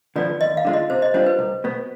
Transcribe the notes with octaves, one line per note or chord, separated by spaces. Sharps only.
D3 F3 B3 D5
D#2 D#5
F5
D3 G#3 D4 F4
D#5
C3 C5
D#5
G3 D4 F4 C5
B4
C2
B2 B3